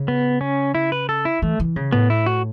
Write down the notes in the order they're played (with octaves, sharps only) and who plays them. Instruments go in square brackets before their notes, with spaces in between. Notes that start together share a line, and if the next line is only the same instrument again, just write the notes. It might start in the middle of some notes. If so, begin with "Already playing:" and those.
Already playing: [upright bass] C#3
[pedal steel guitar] B3
C#4
E4
B4
A4
E4
[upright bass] E3 [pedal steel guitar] A3
[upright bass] E3
C#3
[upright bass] A2 [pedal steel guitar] B3
[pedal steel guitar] E4
F#4